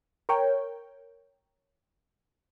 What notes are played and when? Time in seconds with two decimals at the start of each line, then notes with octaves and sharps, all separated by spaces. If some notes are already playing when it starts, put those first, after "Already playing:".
0.29 A#4 C#5 G5